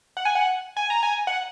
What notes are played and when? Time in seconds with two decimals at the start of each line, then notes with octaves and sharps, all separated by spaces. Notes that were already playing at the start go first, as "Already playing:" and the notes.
0.17 F#5
0.25 G#5
0.35 F#5
0.77 G#5
0.90 A#5
1.03 G#5
1.27 F#5